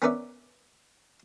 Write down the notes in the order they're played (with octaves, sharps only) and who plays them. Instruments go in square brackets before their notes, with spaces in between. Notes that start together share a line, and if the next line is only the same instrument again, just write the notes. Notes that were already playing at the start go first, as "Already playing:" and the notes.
[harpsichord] B3 C#4 A#4 B4 D5 E5